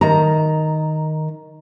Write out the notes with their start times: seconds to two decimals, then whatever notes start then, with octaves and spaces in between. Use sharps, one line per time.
0.01 D#3 A#5